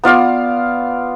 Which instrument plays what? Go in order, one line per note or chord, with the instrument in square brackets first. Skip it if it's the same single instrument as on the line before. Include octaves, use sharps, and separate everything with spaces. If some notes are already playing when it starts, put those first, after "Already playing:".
[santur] B3 F4 D5 F5